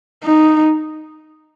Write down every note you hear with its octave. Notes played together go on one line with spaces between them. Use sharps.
D#4